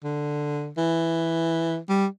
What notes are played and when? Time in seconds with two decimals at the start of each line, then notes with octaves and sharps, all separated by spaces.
0.04 D3
0.78 E3
1.89 G3